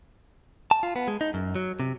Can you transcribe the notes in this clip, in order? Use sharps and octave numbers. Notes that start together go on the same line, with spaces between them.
A5
F4
B3
G#3
D#4
F#2
F#3
C3